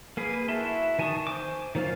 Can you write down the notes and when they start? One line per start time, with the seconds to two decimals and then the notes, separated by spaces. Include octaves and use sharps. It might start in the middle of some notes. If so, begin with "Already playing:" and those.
0.17 A#3 G#4 B4
0.48 E4 F#4 E5 A5 C6
0.99 D#3 G#5 A5 C#6 D#6
1.27 C5 G#5 D6
1.75 D#3 F#3 A#3 F4 F5